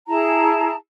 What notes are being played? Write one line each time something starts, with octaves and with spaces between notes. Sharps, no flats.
E4 G#4 A5 A#5